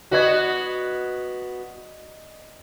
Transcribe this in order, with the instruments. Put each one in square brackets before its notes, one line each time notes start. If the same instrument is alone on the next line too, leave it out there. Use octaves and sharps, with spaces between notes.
[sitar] B3 F#4 [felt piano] D5 D#5 G#6